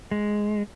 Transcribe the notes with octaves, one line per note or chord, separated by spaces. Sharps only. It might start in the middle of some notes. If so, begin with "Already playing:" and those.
G#3